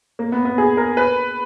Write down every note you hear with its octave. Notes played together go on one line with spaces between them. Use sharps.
A#3
B3
B3
G#4
A#4
B4